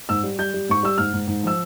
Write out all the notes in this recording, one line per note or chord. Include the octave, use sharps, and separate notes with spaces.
G#2 E6
G3
G3 G6
G3
G#2 C#6
G3 E6
G#2 F6
G#2
G#2
F3 E6